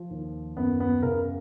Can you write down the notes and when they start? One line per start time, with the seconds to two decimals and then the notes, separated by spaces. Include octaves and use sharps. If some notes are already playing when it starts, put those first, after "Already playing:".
Already playing: F3
0.10 D#2
0.57 F#2 B3
0.80 B3
1.02 C#3 A#4